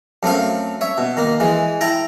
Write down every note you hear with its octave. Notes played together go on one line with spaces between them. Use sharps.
F#2 A3 C4 F5
C#5 E5
B2
D#3 A#3
E3 G#3
E4 G5 A5 A#5